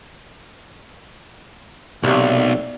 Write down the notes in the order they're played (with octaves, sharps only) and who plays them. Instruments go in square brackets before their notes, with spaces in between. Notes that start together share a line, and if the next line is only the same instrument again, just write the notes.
[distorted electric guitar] B1 [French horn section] A2 A#3 D5 [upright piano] C3